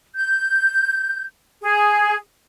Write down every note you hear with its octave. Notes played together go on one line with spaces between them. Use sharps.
G6
G#4